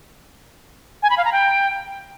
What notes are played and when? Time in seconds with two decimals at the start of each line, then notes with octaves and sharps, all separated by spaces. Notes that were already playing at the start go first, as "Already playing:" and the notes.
1.03 G#5
1.10 B5
1.18 F5
1.25 A#5
1.32 G5